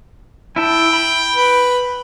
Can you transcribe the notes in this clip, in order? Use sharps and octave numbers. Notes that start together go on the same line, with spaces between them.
E4 G5 A5
B5
B4